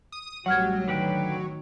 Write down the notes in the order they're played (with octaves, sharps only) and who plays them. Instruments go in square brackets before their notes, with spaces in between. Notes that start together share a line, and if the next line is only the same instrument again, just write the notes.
[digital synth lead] D#6
[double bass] A1 G3 [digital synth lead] F#3 [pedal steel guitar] F#4 [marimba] F#5 F6 G#6
[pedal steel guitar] D3 B4 G5 [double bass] D#3